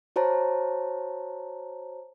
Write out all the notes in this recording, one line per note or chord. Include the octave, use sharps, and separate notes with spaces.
F#4 C5 C#5 A5 A#5